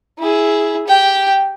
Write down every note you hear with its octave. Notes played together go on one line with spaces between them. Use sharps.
E4 G#4
G4 G5